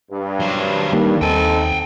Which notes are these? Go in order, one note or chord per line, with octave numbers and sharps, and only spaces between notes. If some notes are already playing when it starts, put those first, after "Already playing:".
G2
F#3 C5
D#3 G3 A#3
D#2 C4 D#4 A4 G5 G#5